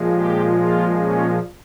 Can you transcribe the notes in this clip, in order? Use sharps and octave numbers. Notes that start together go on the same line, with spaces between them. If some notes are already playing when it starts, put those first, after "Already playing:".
Already playing: A#2 F3 G#3
G4
F4
C#4